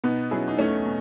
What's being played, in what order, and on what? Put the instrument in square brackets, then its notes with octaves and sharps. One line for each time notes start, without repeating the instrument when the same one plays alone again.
[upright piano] B2 [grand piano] B3 D#4
[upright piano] F#3 C#4 E4 G#4
[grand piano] D#4
[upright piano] E2 [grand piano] A3 C#4
[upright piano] B2